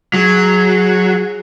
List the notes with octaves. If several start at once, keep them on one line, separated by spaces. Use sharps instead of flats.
F#3 G#4